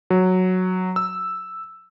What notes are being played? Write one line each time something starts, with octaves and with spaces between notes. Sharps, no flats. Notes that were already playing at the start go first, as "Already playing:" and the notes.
F#3
E6